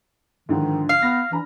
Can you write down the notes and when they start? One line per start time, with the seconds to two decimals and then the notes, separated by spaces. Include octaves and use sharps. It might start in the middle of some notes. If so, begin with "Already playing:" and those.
0.49 G#2 D3 D#3 F3
0.89 F5
1.02 B3 F6 A#6
1.32 E3 D4 A#5 B5